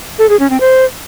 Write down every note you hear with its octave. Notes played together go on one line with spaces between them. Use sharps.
A4
G#4
C#4
C4
C5